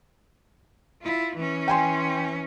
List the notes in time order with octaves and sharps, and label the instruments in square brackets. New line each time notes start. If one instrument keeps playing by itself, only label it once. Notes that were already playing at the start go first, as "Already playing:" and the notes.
[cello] E4 F4
E3 C#4
[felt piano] G5 G#5 C6